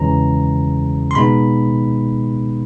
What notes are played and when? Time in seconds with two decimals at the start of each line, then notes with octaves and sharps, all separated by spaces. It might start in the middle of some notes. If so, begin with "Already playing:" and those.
Already playing: E2 C#3 E3 G#3 C#4 A#5
1.11 C6
1.15 B2 G#3 B3 D#4 B5